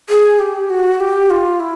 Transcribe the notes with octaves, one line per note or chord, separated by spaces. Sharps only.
G#4
G4
F#4
G4
F4
E4